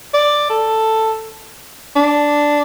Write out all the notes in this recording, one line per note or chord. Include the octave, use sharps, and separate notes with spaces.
D5
A4
D4